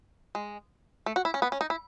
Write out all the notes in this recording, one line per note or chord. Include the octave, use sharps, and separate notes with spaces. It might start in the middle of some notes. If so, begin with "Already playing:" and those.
G#3
A3
F#4
E4
C#4
B3
C#4
D#4
E4